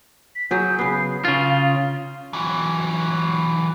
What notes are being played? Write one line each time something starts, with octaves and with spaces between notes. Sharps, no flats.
B6
F#3 G#4 G6
C#3 B3 C7
C#3 F4
E3 F#3